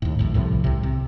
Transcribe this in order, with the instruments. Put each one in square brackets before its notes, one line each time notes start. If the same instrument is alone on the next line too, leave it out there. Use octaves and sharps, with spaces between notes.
[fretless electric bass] D#2 A2
A#1 D#2 A2
C2 A2 C3 F3
C2 C3
C3